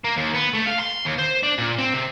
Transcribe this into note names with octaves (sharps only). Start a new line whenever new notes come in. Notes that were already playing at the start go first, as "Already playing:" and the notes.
A#3
D#2
B3
A3
F5
C6
D#2
C5
D4
A#2
C4
C3